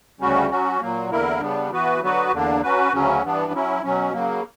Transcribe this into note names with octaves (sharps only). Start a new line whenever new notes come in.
D2 C#3 G3 C#4 F#4
F#3 C#4 F#4
A#2 F#3 A#3
E2 D3 A#3 E4 A#4
C#3 G3 B3 D4
E3 B3 F#4 B4
D3 F#3 B3 F#4 B4
E2 D3 A#3 D4
F#3 C#4 F#4 B4
D2 C#3 F#3 C#4
G2 E3 B3 D4
F#3 C#4 E4
B2 F#3 C#4
C#3 F#3 A#3